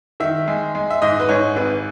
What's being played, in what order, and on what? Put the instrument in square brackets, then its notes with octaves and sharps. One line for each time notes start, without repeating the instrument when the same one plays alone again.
[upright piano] D#3 E5
G#3
G#3
E5
G#2 D#5
B4
G#2 C#5
G#1 B4